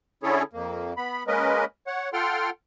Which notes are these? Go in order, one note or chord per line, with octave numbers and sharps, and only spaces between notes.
D3 C#4 E4 G#4 A4 C#5
F2 A#3
B3 B5
G#3 A#3 C#4 A#4 B4 D#5
C#5 F#5
F4 A4 F#5 G5 C6 F6